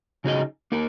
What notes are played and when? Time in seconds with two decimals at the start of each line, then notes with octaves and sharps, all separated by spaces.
0.24 C#3 F#3 D#4 G#4 D#5
0.72 A#3 D#4 A#4